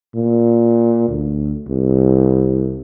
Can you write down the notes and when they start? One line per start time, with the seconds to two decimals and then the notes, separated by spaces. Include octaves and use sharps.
0.15 A#2
1.09 D2
1.69 C2